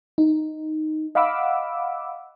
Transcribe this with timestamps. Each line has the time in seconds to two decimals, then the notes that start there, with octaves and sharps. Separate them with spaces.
0.18 D#4
1.15 D#5 F5 F#5 B5 D6 E6